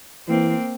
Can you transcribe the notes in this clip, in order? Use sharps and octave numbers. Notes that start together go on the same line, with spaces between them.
E3 A#3 C4